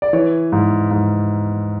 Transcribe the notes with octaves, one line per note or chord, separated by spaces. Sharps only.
D5
E3 C#5
G#2
G#2